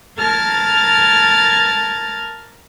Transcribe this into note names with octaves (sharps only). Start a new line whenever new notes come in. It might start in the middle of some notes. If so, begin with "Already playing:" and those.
A#4 A5 F6 G#6 A6